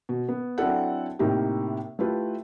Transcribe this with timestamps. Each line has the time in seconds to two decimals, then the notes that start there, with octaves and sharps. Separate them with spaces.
0.09 B2
0.29 B3
0.58 F#3 C4 D4 E4 A4 F#5
1.19 A2 C3 A#3 D#4 G4
1.99 A3 E4 F4 G4 B4